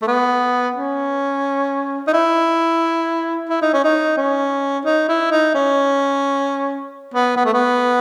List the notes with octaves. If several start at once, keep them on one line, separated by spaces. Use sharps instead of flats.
A3
B3
C#4
D#4
E4
E4
D#4
C#4
D#4
C#4
D#4
E4
D#4
C#4
B3
B3
A3
B3